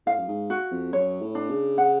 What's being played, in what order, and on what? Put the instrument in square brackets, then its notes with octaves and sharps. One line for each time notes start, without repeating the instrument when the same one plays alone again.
[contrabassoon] A2 [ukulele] F5
[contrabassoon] F#2
G#2
[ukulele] F#4
[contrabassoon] F2
[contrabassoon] F#2 [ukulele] C#5
[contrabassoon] A2
[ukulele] D4
[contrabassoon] C#3
[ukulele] F#5